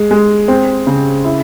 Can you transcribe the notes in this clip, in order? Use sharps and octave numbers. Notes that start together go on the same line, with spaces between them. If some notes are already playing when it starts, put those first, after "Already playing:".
Already playing: G#3
G#3
C4
C#3
E4